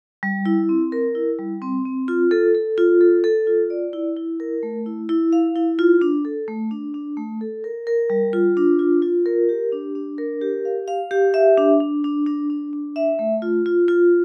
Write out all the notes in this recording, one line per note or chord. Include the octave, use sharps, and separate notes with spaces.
G3
E4
C4
A#4
E4
G3
C4
C4
F4
A4
A4
F4
A4
A4
F4
D5
E4
E4
A#4
A3
E4
E4
F5
E4
F4
D4
A4
A3
D4
D4
A3
A4
A#4
A#4
G3
F4
D4
F4
F4
A#4
G4
D4
D4
A#4
G4
F5
F5
G4
E5
D4
D4
D4
D4
D4
D4
E5
A3
F4
F4
F4